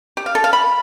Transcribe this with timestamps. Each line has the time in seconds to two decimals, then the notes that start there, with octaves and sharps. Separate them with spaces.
0.17 G4
0.26 F5
0.35 A4
0.44 F5
0.53 B5